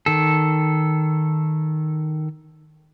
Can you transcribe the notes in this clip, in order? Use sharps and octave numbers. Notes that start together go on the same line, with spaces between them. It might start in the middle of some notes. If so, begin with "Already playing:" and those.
D#3 A4